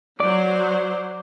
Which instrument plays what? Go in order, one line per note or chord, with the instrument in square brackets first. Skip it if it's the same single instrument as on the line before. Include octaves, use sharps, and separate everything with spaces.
[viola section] F#3 C5 [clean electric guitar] D5